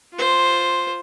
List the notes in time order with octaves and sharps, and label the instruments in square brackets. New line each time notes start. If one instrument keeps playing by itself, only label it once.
[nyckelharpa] F4 C5